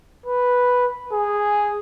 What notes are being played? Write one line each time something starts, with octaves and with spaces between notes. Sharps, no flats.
B4
G#4